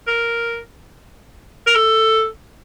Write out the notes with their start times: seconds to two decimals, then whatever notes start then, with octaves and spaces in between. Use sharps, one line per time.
0.07 A#4
1.67 A#4
1.75 A4